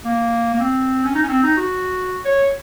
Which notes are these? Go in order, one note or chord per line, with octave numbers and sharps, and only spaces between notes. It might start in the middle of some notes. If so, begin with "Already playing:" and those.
A#3
A#3
C4
C#4
D#4
C#4
C4
D#4
F#4
C#5